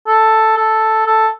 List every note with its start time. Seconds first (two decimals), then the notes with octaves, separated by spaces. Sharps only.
0.07 A4
0.57 A4
1.06 A4